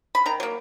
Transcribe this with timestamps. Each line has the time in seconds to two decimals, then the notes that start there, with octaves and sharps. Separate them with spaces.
0.15 B5
0.26 D#3 A#5
0.40 F#3 A#3